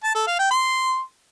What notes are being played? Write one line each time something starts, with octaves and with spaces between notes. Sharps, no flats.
A5
A4
F5
G5
C6